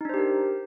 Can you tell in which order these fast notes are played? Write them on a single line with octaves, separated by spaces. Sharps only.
D#4 D4 C5 G4 A#4